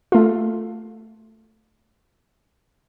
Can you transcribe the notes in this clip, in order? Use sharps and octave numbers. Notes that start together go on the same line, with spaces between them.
A3 F4